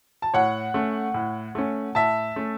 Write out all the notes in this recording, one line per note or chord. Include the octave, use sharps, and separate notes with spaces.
A5
A2 C#5 F#5
A3 C#4
A2
A3 C#4
A2 E5 A5
A3 C#4